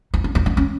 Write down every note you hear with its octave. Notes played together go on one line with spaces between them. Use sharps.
D#4
D4
D#4
D4
C#4